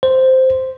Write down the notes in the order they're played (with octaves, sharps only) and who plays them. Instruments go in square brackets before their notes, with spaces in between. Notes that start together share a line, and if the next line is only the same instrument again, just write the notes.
[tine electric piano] C5